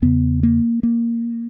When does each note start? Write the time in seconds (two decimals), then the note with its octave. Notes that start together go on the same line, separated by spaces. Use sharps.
0.02 E2 C#3 B3
0.43 A#3
0.83 A#3